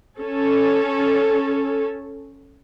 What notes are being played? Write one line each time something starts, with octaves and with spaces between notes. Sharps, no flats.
C#4 A4